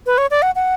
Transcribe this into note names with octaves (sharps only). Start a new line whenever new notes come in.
B4
C#5
D5
F#5
F#5